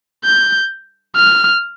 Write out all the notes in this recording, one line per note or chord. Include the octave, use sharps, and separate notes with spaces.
G6
F6